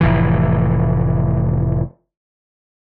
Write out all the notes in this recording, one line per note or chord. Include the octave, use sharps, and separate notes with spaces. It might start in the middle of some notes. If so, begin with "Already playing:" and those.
F1 A2 E3